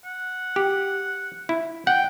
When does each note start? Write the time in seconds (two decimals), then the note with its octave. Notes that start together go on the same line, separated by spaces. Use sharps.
0.05 F#5
0.56 G4
1.49 E4
1.87 F#5 G5